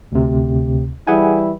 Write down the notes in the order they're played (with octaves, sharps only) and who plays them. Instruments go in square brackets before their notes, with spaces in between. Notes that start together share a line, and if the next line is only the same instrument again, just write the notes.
[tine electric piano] D2 C3
[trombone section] E3 G3 E4 [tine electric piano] G#4 F#5 G#5